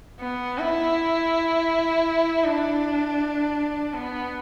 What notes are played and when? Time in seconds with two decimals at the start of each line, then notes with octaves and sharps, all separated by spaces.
0.20 B3
0.58 E4
2.45 D4
3.94 B3